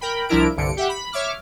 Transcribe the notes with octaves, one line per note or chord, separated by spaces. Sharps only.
A#4 G5 B5
C2 F3 D4 E4 A#4 D7
C2 G2 D3 C#7 D7
G4 E5 F#5
B5
C#5 E5 D6 F6